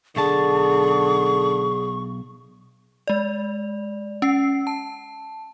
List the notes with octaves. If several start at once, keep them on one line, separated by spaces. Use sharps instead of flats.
B1 D3 G#4 A5 C#6
G#3 D5
C#4 C7
A5